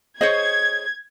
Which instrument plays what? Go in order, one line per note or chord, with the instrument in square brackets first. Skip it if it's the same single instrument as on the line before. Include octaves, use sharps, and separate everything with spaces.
[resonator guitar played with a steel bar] G#4 C5 C#5 [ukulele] D#5 [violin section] G#6